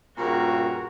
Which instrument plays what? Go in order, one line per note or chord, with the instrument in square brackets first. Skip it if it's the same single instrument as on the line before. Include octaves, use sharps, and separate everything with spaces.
[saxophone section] G2 A#2 C#3 [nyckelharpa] F#4 A#4